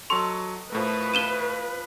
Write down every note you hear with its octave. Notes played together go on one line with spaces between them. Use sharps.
F#3 A4 D#5 C6 C#6
A2 F3 A3 A#4 B4
F5 D#7 E7 G7